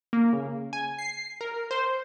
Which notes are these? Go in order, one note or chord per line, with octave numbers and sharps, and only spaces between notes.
A#3
C#3
G#5
C7
A#4
C5